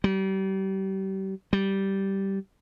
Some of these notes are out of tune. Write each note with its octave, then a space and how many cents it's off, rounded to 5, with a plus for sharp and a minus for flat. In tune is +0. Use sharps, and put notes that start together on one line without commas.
G3 -35
G3 -10